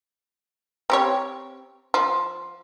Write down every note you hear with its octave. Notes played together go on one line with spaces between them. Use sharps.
C4 G4 C#5
F3